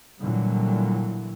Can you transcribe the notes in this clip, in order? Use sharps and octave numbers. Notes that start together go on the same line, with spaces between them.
A#2 D3 E3 F#3 G3